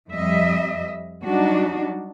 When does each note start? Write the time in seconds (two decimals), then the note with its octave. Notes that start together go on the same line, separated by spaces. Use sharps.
0.13 F2 G3 D#5 E5
1.25 F#3 G3 D4 D#4 F#4